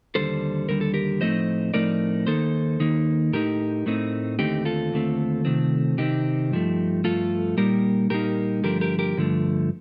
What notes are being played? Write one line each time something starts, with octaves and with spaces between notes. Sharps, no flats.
D#2 D3 G3 A4 C5
D#2 D3 G3 A#4
A4
G4 A#4
A2 F3 A3 C4 D#4 C5 D#5
A2 F3 A3 C4 D#4 A#4 D5
D#2 D#3 A#3 D#4 A4 C5
D#2 D#3 A#3 D#4
A2 A3 C4 D#4 G4 A#4
A2 A3 C4 D#4
D#2 D3 A3 C4 D#4 G4
F4 A4
D#2 D3 A3 C4
C3 D#3 A3 C4
C3 D#3 A3 C4 D#4 G4
G2 F3 A3
G2 F3 A3 F4 A4
A#2 G3 A#3 D#4 G4 A#4
A#2 G3 A#3 D#4 G4 A#4
G2 D3 F3 A3 G4 A#4
G4 A#4
G4 A#4
G2 D3 F3 A3